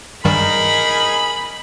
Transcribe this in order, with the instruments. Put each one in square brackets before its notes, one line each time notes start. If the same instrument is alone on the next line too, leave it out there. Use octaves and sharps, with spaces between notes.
[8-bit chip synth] G2 D#3 G3 [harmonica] D#4 G#4 A#4 [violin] B5